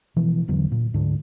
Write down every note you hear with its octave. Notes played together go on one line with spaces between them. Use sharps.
B2 E3 F3
E1 E2 D3 F#3
A#2
D2 G#2 D3